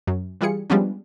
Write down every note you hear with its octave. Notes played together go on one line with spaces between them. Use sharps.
F#2
E3 G3 F4 G#4 C#7
F3 G3 G#3 B3 C#4 D4